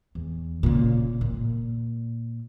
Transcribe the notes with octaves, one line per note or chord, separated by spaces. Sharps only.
E2
A#2 C#3
A#2